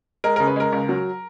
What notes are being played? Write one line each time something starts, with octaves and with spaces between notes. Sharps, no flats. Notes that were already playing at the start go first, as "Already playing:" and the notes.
G#3 A#4
A#4
C#3
B4
G#3 A#4
C#2
F#3